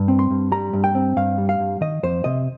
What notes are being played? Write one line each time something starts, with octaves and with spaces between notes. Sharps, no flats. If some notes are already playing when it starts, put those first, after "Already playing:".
Already playing: G2
C4
C6
G2
G3 A#5
G2
G5
C4
G2 F5
G3
F5
G2
D#3 D#5
F2 C5
C3 D#5